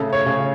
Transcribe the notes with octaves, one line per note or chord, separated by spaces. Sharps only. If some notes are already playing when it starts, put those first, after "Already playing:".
Already playing: A2 C#3 A4
C#5
C#3